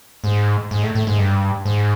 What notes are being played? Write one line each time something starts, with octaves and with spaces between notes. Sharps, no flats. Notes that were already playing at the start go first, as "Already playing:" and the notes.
G#2
G#2
A2
A2
G#2
G2
G#2